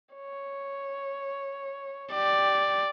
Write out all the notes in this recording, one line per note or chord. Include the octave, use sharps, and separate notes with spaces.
C#5
G4 D5